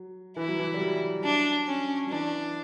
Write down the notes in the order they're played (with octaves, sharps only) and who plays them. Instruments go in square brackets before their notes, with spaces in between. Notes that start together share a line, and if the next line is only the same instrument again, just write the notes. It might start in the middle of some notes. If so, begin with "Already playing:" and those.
Already playing: [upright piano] F#3
[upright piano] E3 [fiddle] E4
[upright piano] F#3
E3
G3
F#3
[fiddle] D4
C#4
[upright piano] F#3
[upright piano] E3 [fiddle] D4